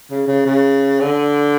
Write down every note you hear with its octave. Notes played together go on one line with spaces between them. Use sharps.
C#3
C#3
C#3
D3